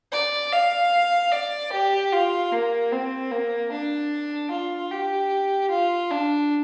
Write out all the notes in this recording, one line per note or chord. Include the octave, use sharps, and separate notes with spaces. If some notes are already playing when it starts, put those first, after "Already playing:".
D5
F5
D5
G4
F4
A#3
C4
A#3
D4
F4
G4
F4
D4